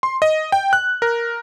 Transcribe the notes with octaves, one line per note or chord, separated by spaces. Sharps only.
C6
D#5
G5
F#6
A#4